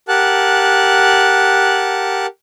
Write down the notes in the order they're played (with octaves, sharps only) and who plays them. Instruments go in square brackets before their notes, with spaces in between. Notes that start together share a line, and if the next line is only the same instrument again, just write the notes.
[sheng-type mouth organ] G4 A#4 F#5 A5 F#6